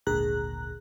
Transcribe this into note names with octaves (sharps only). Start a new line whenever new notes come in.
G#1 D2 A#2 G#4 A#5 F#6